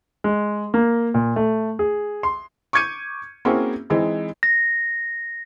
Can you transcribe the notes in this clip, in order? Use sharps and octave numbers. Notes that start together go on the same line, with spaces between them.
G#3
A#3
A#2
A3
G#4
C6
C#6 D6 G6 G#6 C#7 D#7
A#3 C4 C#4 E4 F#4 G#4
E3 G#3 C4 D#4
A#6